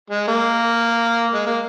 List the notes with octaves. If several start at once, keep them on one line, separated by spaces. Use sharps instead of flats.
G#3
A#3
G#3
A#3